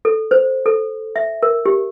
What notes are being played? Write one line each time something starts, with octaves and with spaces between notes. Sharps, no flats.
A4
C5
A4
E5
A#4
G4